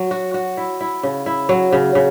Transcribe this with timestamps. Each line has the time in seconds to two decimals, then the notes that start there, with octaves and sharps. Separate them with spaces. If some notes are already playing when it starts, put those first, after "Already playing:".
Already playing: F#3
0.11 F#4
0.34 F#4
0.57 E4
0.81 E4
1.03 C#3
1.26 E4
1.49 F#3
1.73 C#3
1.95 C#3